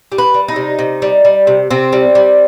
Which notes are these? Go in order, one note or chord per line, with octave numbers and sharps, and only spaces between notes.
G3
B4
G3
D#4
C3
C3
G3
G3
C3
C3 C4
G3
G3